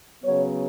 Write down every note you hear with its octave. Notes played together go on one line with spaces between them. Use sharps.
C#3 F#3 B3 C#5